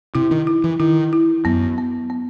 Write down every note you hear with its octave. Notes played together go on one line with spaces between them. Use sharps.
C3 E4
D#3
E4
E3
D#3 E4
E4
F#2 B3
B3
B3